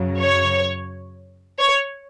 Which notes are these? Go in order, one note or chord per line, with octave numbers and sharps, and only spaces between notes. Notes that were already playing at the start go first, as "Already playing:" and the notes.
Already playing: F#2 C#3 F#3
C#5
C#5